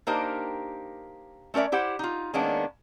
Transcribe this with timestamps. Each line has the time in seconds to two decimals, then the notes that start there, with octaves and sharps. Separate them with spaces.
0.07 A#3 D4 D#4 G4 A#4 C5
1.54 A3 C#4 A#4 D5 E5
1.72 E4 G4 C5 F#5
1.99 D#4 F4
2.34 D#3 G#3 A#3 B3 C#4 D4